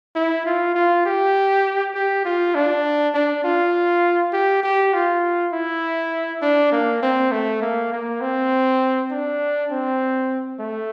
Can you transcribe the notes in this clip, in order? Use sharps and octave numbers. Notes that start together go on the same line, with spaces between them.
E4
F4
F4
G4
G4
F4
D4
D4
F4
G4
G4
F4
E4
D4
A#3
C4
A3
A#3
A#3
C4
D4
C4
A3